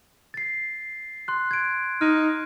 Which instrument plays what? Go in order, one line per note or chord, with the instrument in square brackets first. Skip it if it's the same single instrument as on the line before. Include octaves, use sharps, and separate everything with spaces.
[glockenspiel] A6 C7
C6 F#6
G#6 D7
[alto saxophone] D#4 [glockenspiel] F6